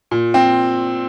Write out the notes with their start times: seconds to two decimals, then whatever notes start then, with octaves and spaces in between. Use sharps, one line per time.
0.11 A#2
0.34 C4